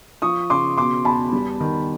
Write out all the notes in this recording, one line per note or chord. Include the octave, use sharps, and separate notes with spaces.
F3 C#6 D#6
C#3 C6 D6
B2 C6 D6
E2 A5 B5
G3
D#3